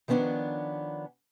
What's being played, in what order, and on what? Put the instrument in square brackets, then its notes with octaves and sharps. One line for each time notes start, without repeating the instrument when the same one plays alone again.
[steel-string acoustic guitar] D#3 F3 B3 C#4 D4